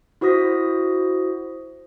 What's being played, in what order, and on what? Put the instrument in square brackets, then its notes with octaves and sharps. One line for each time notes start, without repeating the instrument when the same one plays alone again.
[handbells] E4 F#4 C5 D#6 A#6 B6